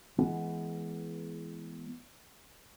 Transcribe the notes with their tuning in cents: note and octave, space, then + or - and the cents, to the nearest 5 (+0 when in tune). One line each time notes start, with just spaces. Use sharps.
E3 +10 G#3 +20 B3 +0